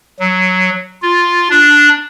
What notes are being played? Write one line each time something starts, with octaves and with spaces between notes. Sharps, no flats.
F#3
F4
D4